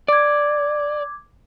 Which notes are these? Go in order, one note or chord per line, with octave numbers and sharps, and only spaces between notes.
D5 D6 G#6